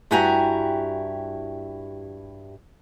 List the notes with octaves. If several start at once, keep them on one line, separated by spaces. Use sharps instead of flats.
G2 E4 F#4 G4 G#5 A#5